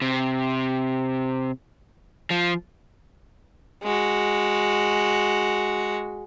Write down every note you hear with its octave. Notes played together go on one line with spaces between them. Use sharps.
C3
F3
G#3 F#4